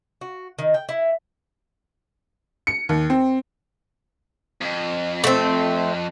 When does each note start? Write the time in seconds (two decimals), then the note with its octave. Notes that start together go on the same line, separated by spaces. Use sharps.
0.21 F#4
0.58 D#3
0.74 G5
0.89 E4
2.67 C#7
2.89 D#2
3.10 C4
4.61 F2
5.24 A3 C4